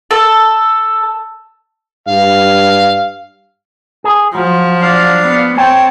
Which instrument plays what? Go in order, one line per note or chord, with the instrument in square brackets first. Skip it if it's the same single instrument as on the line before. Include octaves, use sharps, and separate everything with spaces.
[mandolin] A4
[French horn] G2 [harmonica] F5
[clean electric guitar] G#4
[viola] F3 [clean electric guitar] F#3
[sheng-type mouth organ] D4 F5
[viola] B3
[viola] C4 [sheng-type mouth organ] C#5 A5 [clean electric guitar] G5